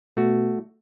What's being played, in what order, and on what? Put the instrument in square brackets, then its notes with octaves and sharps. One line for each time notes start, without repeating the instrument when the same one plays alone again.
[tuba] B2 [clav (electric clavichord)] A3 F#4